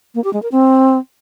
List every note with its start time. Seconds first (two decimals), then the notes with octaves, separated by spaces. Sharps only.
0.15 A#3
0.24 G4
0.33 G#3
0.43 A#4
0.52 C4